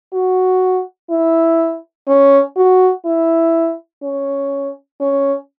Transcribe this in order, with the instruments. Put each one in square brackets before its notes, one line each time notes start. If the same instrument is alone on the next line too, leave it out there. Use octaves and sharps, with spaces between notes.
[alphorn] F#4
E4
C#4
F#4
E4
C#4
C#4